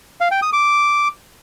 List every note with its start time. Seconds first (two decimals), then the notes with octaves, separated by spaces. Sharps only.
0.21 F5
0.31 G5
0.42 D#6
0.53 D6